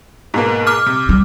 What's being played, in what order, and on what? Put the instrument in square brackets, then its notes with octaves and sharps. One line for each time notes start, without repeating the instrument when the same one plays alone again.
[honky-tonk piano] G#2 B2 A#3
[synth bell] D6 F6
[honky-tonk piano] C3
[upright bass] G3